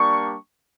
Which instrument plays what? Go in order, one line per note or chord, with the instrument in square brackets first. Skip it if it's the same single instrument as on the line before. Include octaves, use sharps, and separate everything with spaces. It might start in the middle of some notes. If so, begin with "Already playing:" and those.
Already playing: [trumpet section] G3 A#3 D4 G4 C#6